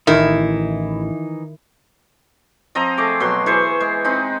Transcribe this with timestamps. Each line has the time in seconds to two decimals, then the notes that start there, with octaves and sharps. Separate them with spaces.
0.07 A1 D#3 E3 D#4 E4
2.75 F3 C4 D#5 A#5
2.98 A3 G#4 D6
3.20 B2 F#3 C6
3.46 E3 G#4 C5 C#6
3.80 G#3
4.04 C4 D#4 B5